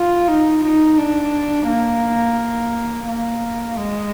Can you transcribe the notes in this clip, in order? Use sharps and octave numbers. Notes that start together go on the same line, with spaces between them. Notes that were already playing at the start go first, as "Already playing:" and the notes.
Already playing: F4
D#4
D#4
D4
A#3
A#3
G#3